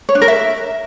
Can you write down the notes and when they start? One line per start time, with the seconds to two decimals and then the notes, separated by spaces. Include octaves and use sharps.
0.09 C#5
0.15 D4
0.22 A#4
0.28 E5